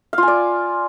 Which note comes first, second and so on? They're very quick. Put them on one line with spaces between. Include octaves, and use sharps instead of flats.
F5 F4 G#5 D5